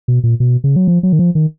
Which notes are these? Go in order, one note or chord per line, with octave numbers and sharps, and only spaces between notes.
B2
A#2
B2
C#3
F#3
F3
F#3
D#3
F3
D#3